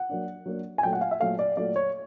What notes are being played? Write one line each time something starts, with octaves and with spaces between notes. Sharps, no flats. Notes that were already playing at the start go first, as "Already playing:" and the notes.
Already playing: F#5
F#3 A#3 D4
F#3 A#3 D4
G#5
A#2 F#3 A3 G5
F#5
F5
E5
A#2 F#3 A3 F5
D5
A#2 F#3 A3 D5
C#5